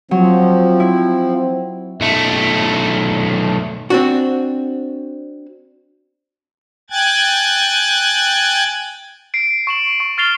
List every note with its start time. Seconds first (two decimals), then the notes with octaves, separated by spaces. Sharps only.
0.11 F3 F#3 C4
0.80 E4
2.01 B1 A3
3.90 C4 D4 F#4
6.90 G5 G#5 F#6 G#6 A6
9.34 C7 D7
9.67 C#6 E7 F#7
10.00 C#6
10.17 C#6 F6 A6 C7 F7 G7